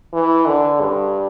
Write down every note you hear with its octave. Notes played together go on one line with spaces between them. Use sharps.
E3
D3
G2